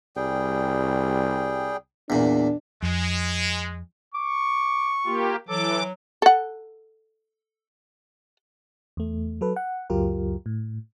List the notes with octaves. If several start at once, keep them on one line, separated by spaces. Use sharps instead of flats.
C2 G3 G#4 G5
E2 A#2 D4
F2 G#3
C#6 D6
A#3 F4 G4
E3 F#3 A4 D6
A4 F#5
E2 A3
F#3 A4 B4
F#5
C#2 F#2 F#3 F4 G4 A#4
A2